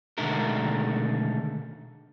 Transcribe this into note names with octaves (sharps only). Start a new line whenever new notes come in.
B2 D3 D#3 G#3 A3 A#4